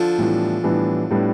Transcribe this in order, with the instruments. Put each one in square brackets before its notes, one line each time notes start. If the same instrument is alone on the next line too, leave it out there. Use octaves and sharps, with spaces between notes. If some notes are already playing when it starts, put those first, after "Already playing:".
Already playing: [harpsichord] D3 F3
[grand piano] A2 E3 G3 B3 D4
A2 E3 G3 B3 D4
A2 G3 B3 D4